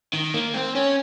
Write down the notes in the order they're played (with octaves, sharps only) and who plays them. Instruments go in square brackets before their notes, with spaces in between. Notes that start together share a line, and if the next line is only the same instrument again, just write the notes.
[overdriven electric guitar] D#3
A#3
C4
C#4